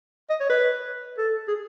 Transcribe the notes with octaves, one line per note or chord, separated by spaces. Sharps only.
D#5
C#5
B4
A4
G#4